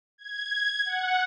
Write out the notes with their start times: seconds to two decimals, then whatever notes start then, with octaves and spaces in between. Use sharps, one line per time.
0.18 G#6
0.85 F#5